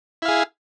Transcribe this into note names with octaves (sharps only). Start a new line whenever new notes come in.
E4 G#4 F5